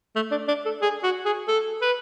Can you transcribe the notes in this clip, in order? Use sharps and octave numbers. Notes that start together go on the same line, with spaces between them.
A3
D4
D4
A4
G#4
F#4
G#4
A4
B4